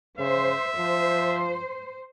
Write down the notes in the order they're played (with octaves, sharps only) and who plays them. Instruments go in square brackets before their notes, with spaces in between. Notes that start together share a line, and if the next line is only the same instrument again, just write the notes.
[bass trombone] C#3 [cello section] C5 [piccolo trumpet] E5
[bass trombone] F3 [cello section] C5